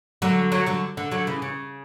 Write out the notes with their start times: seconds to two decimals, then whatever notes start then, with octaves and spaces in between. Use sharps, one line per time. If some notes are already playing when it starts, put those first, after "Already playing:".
0.22 D3 F#3
0.52 D3 F#3
0.66 D3 F#3
0.97 D3
1.11 D3 F#3
1.27 C#3 E3
1.42 C#3